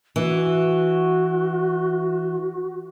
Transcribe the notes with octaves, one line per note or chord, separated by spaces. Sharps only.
E3 F#4